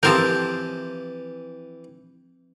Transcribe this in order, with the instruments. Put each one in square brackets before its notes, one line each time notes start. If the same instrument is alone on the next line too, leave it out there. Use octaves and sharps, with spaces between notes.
[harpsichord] E3 G4 A5 [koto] F3 C4 A#4 [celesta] G6